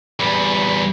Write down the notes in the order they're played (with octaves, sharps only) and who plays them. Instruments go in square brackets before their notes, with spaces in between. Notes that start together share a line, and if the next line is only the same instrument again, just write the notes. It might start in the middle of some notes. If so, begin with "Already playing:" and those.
[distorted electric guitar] E2 G3